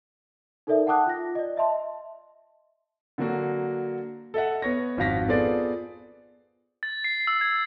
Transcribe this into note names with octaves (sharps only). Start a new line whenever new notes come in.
D#4 A4 A#4 D5 E5
F#5 G5 A5 D6 D#6 F#6
F4 A#6
D5 D#5
D#5 E5 A5 C6
D3 F#3 A#3 F#4
A4 D#5 E5 F#5
B3 C#5 A#6
G#1 F2 F#4 F5 A#6 B6
B3 F4 G#4 A4 C5 D5
A6
C7
E6
G#6